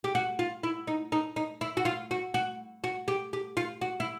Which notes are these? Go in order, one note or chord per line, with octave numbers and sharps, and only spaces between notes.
G4
F#4
F4
E4
D#4
D#4
D#4
E4
F#4
F4
F#4
F#4
F#4
G4
G4
F4
F#4
E4